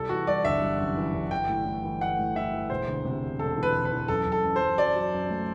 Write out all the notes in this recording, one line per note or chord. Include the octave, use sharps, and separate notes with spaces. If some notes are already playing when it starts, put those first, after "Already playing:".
Already playing: C2 G3 A4
E3 F#4
G3 D5
G1 E5
G3
F#2
E3
G1
E3 G5
A2
A2
E3
A3 F#5
A2
E3 E5
E3
E1 C5
D2
C3
E1
E1 A4
E3
B4
E1
B4
E3
F#2 A4
F#2
A4
F#2
C5
F#2
F#3 D5
F#3
F#2
A3